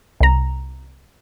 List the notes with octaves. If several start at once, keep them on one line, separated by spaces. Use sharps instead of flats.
C2 A#5